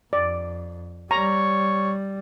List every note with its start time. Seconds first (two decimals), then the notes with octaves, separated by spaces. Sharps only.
0.13 F2 D5
1.11 G3 C#5 A#5